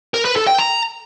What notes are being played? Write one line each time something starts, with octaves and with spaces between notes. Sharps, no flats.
A#4
B4
A4
G5
A#5